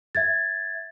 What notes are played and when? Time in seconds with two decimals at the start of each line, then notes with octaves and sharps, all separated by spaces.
0.15 E5 G#6 A6